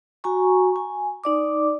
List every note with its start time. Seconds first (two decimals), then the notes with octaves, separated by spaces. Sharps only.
0.24 F#4 G#5 A#5 C#6
0.76 G#5
1.24 D#4 D5 D6